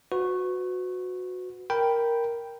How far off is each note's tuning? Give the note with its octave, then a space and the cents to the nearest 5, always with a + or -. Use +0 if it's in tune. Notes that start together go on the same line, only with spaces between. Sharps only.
F#4 -15 B4 +30
A#4 +0 G5 +0 B5 +0